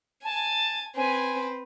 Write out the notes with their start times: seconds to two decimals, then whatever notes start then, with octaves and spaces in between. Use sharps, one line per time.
0.24 G#5 A5
0.96 C4 B4 G#5